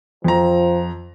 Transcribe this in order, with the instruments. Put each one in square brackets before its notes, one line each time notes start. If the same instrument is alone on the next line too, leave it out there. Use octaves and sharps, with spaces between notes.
[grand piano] F2 A#5 [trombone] F3